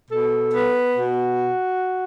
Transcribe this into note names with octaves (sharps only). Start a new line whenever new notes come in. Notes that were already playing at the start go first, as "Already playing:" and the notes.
B2 A4
B3
B2 F#4